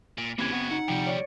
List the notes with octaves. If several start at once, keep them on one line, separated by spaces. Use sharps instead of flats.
A#2
C#3 E3 A#3 C4 G4 G#6
C#3 B3 F#4
D#4 F#5
D2 C3 F3 G3 G5 D7
C#5 D5 C#7